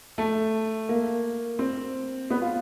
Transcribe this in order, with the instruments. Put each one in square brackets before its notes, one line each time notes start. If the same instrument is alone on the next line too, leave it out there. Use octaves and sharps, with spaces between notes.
[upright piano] A3
A#3
C4
B3
F4